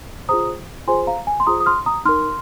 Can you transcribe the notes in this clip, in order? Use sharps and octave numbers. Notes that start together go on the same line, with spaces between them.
F4 G#4 C5 A#5 D#6
F4 G#4 C5 G#5 C6
F5 A#5
G#5
C6
F4 G#4 C5 A#5 D#6
D#6
C6 F6
A#5 D#6
D#4 A#4 C6 F6